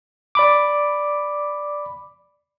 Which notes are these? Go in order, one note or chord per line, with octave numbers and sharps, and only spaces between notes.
D5 B5 D6